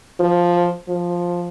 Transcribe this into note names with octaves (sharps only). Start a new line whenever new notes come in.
F3
F3